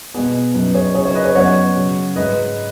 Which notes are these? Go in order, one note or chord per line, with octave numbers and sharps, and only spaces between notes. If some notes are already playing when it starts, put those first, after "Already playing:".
B2 G#3 B3 G#4
F#2 F#3 D#4 B4
G#4 C#5
C#3 F#3 D#4 G#4 C#5
G#4 C#5
B4 D#5
G#4 C#5
F#2 F#3 B3 D#4 C#5 F#5
C#3 F#3 C#4
G#2 G#3 D#4 B4 D#5